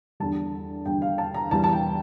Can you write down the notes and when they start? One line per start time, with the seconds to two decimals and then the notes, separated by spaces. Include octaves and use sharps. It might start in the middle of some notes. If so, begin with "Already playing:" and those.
0.20 E2 D3 G3 A5
0.85 E2 D3 G3 G5
1.02 F5
1.18 A5
1.34 A#5
1.51 E2 E3 G3 A5
1.64 A5
1.73 G5